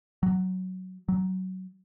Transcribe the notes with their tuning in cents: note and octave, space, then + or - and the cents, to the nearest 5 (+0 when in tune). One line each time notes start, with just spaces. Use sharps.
F#3 +5
F#3 +15